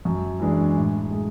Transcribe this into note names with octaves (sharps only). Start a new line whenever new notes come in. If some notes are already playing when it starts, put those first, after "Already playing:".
F#2
E3 G#3 D4
A2
G#3